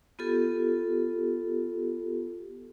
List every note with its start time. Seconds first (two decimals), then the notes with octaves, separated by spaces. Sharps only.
0.19 B3 F4 G4 A4